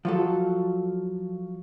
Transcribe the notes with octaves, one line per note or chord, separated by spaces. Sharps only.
F3 F#3 A4